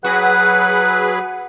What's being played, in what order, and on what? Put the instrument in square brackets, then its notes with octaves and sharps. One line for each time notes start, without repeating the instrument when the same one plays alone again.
[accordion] F#3 G#4 B4 [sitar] F#4 [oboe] F#5